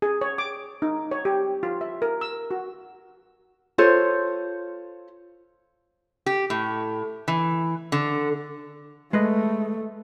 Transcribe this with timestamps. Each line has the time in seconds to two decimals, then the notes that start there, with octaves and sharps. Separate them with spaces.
0.02 G#4
0.21 C#5
0.38 D6
0.82 D#4
1.11 C#5
1.25 G4
1.63 F4
1.81 E5
2.02 A#4
2.21 E6
2.51 F#4
3.78 F4 A4 C5 C#5
6.26 G4
6.50 A2
7.28 E3
7.92 D3
9.13 G#3 A3 B4 D#5